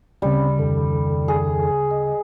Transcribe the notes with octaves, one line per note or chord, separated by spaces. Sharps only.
D2 C#3 G3 C4 C#4
F2 D#3 A4
G#4
D#5